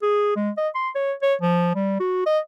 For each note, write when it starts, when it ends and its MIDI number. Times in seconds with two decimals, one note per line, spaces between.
0.02 0.33 68
0.36 0.50 56
0.57 0.68 75
0.75 0.89 84
0.95 1.12 73
1.22 1.35 73
1.42 1.73 53
1.75 1.98 55
2.00 2.21 66
2.26 2.39 75